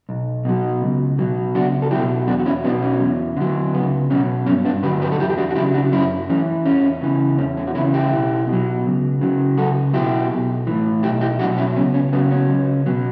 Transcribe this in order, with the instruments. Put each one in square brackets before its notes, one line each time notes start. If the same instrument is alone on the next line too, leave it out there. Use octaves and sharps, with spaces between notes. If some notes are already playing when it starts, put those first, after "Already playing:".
[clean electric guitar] B1
B2 F#3
C#2
B2 F#3
C#2 D4 F#4
A4
B2 F#3 E4 G4
E2 D4 F#4
F#4
C#4 E4
B2 F#3 B3 D4
C#4
E2
D3 F#3
C#2 B3
B2 F#3 C#4
G2 C#4
B3 D4
D3 F#3 G4 B4
G4 B4
A4
E2 E4 G4
G4
D4 F#4
F#4
C#3 F#3 E4 G4
D4 F#4
F#2 C#4 E4
E3 C#4
E2 C#4
C#3 E3
E2 C#4
C#4
F#4
C#3 C#4 E4
E3
E4 G4
B1
B2
F#3
C#2
C#3 F#3
C#2 F#4 A4
B2 F#3 E4 G4
B1
A2 E3
B1 E4 G4
E4 G4
B2 F#3 D4 F#4
C#4 E4
C#2 C#4
C#4
C#3 F#3 B3
C#4
C#2
B2 F#3